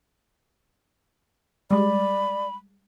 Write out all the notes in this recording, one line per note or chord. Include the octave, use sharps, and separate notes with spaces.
G3 G#3 D5 B5